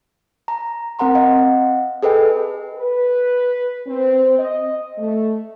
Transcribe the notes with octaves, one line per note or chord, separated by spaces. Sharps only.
A#5
C4 A#4 F#5 A#5 C6
D#5 F5 F#5
G#4 A4 B4 D#5 G5
B4
C4
D#5
A3